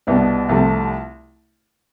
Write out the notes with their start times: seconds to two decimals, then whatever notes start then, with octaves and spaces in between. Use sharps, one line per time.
0.07 C2 B2 B3 D4
0.49 C2 C3 F3 A3